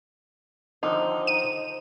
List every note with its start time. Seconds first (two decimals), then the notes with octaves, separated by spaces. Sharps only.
0.83 D3 D#3 F3 D#4 C5
1.27 D#7